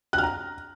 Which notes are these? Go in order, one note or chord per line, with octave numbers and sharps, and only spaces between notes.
F#6
F6
A#5